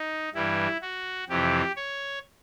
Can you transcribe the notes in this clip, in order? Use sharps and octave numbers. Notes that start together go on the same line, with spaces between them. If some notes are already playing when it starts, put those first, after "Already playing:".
Already playing: D#4
G2 E3 G3 E4
F#4
F2 C3 E3 G4
C#5